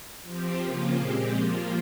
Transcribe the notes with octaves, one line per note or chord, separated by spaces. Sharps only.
F3 C4 G4
C#3 F3 A#3 F4
A#2 G#3 C4 G4
F3 A#3 F4